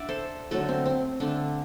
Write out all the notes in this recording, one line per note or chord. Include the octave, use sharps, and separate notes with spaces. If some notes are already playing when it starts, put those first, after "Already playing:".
Already playing: D4 D5 E5 F#5
A4 C5
D3 F#3 A3 F#4 A4
C4
C4
D3 A3 D4